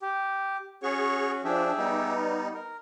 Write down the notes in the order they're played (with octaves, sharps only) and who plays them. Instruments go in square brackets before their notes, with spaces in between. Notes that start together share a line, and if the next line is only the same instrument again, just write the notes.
[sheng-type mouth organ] G4
[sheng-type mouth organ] C#4 F#4 [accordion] G#4 C#5 C#6
[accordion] F3 D4 [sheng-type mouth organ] G4 G#4 E5
[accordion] G3 B3 D#4
[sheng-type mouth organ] A#4